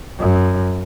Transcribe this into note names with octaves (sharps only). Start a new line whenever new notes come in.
F#2